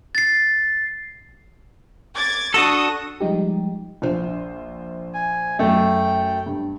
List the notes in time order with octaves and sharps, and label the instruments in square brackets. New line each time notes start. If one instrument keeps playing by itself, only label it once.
[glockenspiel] A6 C7
[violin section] D6 G#6 A6
[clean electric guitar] D4 F#4 A4 [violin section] C#6 D#6
[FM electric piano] F3 G3 G#3 D#4 G4
[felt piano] A#1 F4 C5
[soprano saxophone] G#5
[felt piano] F#2 [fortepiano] A3 [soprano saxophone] G5
[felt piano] G2